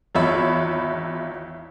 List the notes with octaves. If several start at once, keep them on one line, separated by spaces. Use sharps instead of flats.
G#1 E2 F4 C#5 E5 B5